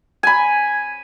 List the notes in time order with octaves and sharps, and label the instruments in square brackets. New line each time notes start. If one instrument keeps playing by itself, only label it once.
[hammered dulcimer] G#5 B5